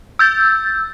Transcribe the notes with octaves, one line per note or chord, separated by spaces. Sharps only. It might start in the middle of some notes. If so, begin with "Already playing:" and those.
E6 G6 A6